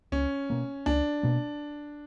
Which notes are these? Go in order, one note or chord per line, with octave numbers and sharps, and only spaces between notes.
C#2 C#4
B2 A#3
C#2 D4
B2 A#3